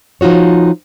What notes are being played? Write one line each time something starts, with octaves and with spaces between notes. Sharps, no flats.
F3 D#4 F4 F#4 C#5